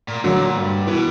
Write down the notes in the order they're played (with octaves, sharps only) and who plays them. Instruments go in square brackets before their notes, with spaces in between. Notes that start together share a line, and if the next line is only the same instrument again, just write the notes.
[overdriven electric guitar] A#2
[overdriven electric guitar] A#2 [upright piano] D3 F#3
[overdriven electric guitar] G2
[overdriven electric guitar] B2 [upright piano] E3